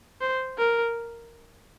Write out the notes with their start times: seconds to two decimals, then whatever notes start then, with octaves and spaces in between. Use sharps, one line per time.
0.21 C5
0.58 A#4